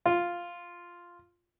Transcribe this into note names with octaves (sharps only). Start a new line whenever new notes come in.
F4